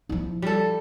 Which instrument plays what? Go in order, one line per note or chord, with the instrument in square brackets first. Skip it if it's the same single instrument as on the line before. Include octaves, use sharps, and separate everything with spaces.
[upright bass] F3 E4
[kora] G3 A4